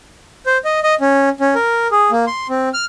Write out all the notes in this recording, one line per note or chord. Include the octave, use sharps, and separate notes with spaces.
C5
D#5
D#5
C#4
C#4
A#4
G#4
A#3
C6
C4
F6